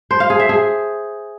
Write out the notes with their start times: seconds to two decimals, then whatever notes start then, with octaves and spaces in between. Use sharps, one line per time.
0.11 C5
0.20 F5
0.30 G#4
0.40 E5
0.49 G#4